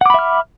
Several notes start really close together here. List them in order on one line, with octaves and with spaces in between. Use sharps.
F#5 D6 B5 E5 F6